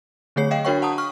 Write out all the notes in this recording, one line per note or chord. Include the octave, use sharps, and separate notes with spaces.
D3 F#3 A3 G#4 C#5 C7
D#5 F5 G5
D4 F#4 A#4 C#5 G5 C#6
F#5 A5 A#5 D#6
C#6 F6